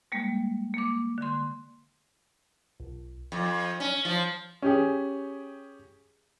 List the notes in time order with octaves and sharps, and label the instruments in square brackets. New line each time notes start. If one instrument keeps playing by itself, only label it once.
[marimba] G3 G#3 A#3
A#3 D6
D3 C6
[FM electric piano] B1
[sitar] F2
C#4
F3
[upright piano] C#4 G4 G#4